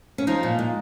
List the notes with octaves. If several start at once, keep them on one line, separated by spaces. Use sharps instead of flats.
C#4
F3 D#4
A#2
G#3